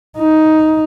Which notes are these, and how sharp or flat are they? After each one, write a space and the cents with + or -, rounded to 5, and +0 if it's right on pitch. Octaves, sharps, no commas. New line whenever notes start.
D#4 +5